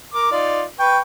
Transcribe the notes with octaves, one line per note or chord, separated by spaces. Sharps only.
A#4 D6
D#4 F4 D5
B4 G5 C#6